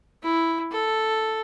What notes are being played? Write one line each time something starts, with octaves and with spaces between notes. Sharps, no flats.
E4
A4